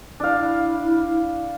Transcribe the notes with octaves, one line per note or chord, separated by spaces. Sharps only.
D4 E4 F5